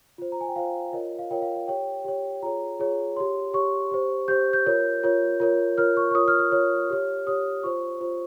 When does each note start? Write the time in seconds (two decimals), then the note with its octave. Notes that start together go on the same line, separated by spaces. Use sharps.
0.18 F4 C5
0.32 A#5
0.41 G#5
0.48 G5
0.56 F4 C5 F5
0.93 F4 A#4 C#5 D#5
1.19 F5
1.30 F4 A#4 C#5 G5
1.42 F5
1.56 F5
1.68 G4 C#5 G5
2.05 G4 C#5
2.42 F4 G#4 C#5 A#5
2.79 F4 G#4 C#5
3.16 G4 C#5 C6
3.53 G4 C#5 C#6
3.91 G4 C5
4.28 G4 C5 G6
4.53 G6
4.66 F4 A#4 C#5
5.03 F4 A#4 C#5
5.40 F4 A#4 C#5
5.78 F4 A#4 C#5 F6
5.97 C#6
6.11 C#6
6.15 F4 A#4 C#5 D#6
6.28 F6
6.39 F6
6.52 F4 A#4 C#5
6.90 G4 C#5
7.27 G4 C#5 D#6
7.63 F4 C5 C#6
8.01 F4 C5